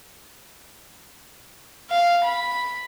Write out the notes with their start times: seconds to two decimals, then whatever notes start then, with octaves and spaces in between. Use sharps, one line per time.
1.90 F5
2.24 B5